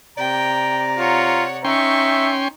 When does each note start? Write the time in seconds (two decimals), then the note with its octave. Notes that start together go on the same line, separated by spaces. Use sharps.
0.18 C3 D5 G5 A#5
0.98 F4 C#5 F#5
1.65 C#4 D#4 E5 G5 C6 C#6